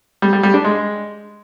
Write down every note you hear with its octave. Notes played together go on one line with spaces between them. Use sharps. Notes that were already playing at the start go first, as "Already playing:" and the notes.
G3
G3
G3
D4
G#3